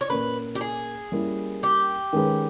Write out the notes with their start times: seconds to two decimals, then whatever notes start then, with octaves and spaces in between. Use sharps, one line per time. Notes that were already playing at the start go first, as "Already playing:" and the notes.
0.01 C#5
0.10 A#2 A#3 C#4 B4
0.55 G4
0.61 G#4
1.12 G3 A#3 C#4 E4
1.63 G4
2.13 D#3 G#3 C#4 G#4 B4